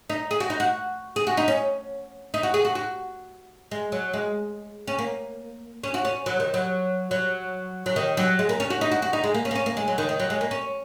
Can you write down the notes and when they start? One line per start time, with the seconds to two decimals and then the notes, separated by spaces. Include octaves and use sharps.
0.10 D#4
0.31 G#4
0.40 F#4
0.50 D#4
0.60 F#4
1.16 G#4
1.27 F#4
1.37 D#4
1.48 C#4
2.34 D#4
2.43 F#4
2.54 G#4
2.65 F#4
2.75 F#4
3.71 G#3
3.92 F#3
4.13 G#3
4.87 C#4
4.99 A#3
5.84 C#4
5.94 F#4
6.05 C#4
6.26 F#3
6.40 D#3
6.54 F#3
7.11 F#3
7.86 F#3
7.96 D#3
8.17 F#3
8.39 G#3
8.49 A#3
8.60 C#4
8.70 F#4
8.81 D#4
8.92 F#4
9.02 F#4
9.13 D#4
9.24 G#3
9.35 A#3
9.45 C#4
9.51 A#3
9.56 C#4
9.66 A#3
9.77 G#3
9.88 F#3
9.98 D#3
10.09 D#3
10.20 F#3
10.30 G#3
10.41 A#3
10.51 C#4